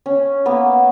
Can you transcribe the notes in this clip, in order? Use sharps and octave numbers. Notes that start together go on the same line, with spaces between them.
C#4
A#3 B3